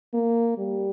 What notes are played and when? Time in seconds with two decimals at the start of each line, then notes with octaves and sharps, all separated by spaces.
0.14 A#3
0.58 G3